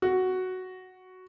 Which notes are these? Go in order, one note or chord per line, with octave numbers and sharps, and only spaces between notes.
F#4